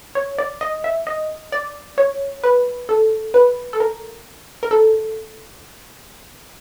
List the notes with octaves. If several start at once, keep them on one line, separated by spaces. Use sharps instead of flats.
C#5
D5
D#5
E5
D#5
D5
C#5
B4
A4
B4
A4
A#4
A#4
A4